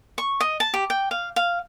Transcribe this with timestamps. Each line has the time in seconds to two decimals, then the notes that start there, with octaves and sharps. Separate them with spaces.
0.18 C#6
0.40 D#5
0.60 A5
0.74 G4
0.90 G5
1.11 F5
1.36 F5